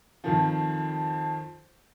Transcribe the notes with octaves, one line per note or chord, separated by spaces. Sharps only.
F2 D#3 F3